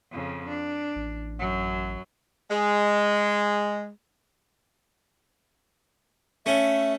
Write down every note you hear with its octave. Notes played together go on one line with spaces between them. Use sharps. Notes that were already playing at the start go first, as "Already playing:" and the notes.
F2 C#3
D4
A1
F#2 F#3
G#3
A3 C#4 E5